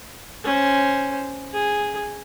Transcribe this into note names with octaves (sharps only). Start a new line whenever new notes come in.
C#4 C5
G#4